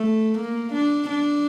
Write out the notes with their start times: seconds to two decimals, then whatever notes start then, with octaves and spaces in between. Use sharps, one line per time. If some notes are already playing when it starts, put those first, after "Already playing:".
Already playing: A3
0.38 A#3
0.73 D4
1.09 D4